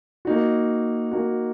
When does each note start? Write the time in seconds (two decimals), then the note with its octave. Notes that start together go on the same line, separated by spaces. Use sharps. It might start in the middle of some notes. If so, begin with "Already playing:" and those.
0.25 A#3 D#4 F#4
1.11 A#3 D#4 F#4